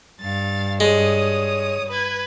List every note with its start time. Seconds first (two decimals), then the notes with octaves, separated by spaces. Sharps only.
0.20 G2 F5 A6
0.80 G#3 C#5 D#6
1.89 B4 G#6